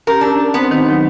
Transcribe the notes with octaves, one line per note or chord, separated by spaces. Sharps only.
C#4 G4 A#4
D4 A5 E6
B3 C4 C5
D#3 C4 D#4
F#3